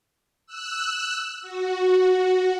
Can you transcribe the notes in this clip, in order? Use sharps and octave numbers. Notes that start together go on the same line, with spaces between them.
E6 F#6
F#4